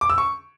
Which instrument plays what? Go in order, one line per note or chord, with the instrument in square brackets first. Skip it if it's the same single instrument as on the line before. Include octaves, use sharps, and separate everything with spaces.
[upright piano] D6
E6
C#6